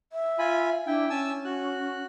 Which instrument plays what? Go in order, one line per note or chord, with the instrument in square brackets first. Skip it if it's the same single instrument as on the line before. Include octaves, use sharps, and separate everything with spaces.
[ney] E5
[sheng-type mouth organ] F4 G#5 B5
[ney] D4 [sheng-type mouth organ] E4 G5
[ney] C#4 [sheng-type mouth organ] G#5 A5 E6
[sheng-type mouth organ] F#4 F#6